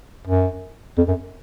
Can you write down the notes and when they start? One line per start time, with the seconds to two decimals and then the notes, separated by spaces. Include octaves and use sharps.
0.27 F#2
0.97 F2
1.08 F#2